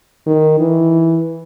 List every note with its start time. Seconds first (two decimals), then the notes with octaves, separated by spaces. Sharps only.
0.26 D#3
0.60 E3